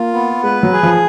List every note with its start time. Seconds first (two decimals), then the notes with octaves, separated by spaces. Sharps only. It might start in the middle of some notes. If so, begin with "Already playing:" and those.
Already playing: A#3 F4
0.13 B3
0.43 G#3 B4
0.63 F#3
0.73 G#4
0.83 F3